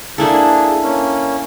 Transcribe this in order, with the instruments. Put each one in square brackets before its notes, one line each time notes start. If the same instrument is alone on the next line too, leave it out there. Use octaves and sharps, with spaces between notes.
[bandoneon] A#3 G#4 [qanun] D4 E4 A4
[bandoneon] A#3 C#4